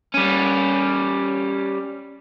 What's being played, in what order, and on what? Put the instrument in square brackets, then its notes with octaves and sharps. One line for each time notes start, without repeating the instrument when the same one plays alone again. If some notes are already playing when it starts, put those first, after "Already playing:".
[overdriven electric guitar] G3 C#4